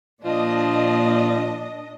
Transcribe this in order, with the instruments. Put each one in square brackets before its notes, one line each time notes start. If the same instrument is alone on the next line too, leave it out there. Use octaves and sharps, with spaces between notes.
[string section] A#2 D4 D#5 [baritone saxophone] F3